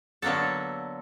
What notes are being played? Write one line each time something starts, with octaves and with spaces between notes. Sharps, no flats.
D3 F#3 A#3 B3 A4